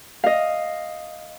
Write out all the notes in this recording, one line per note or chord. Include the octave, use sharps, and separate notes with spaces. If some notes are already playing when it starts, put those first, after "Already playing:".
D#5 F5